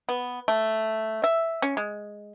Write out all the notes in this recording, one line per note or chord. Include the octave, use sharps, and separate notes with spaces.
B3
A3
E5
C#4
G#3